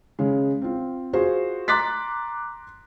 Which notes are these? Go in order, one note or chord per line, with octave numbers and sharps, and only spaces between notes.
C#3 G#3
C4 F4
F4 F#4 G#4 C5
A#5 C6 D6 F#6 A6 B6